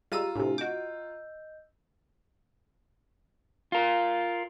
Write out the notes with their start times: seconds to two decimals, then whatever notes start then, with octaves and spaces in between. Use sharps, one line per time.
0.12 G3 G#3 F4 A#5 E6 D#7
0.36 A2 C3 D4 G4 G#5
0.58 F#4 D#5 D6 G6
3.72 F4 A#4